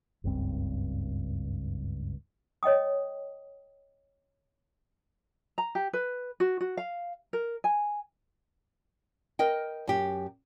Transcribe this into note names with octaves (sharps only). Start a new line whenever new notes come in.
F#1 C#2 G2 C4
C#5 D#5 G5 D#6
A#5
G4
B4
F#4
F#4
F5
A#4
G#5
A#4 D#5 G5
F#2 G4